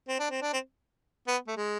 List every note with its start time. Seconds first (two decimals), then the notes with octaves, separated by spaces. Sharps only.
0.08 C4
0.19 D4
0.30 C4
0.42 D4
0.53 C4
1.27 B3
1.47 A3
1.57 G#3